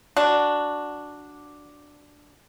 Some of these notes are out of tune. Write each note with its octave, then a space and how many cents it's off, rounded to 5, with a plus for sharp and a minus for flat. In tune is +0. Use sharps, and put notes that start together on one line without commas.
D4 +0 F#4 +0